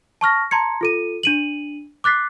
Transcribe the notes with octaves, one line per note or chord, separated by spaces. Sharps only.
A5 C#6 F6 A#6
A5 A#5 C6 G#6 C#7
F4 A4 D#7
D4 D#7 F#7
D6 F#6 A6 B6 C7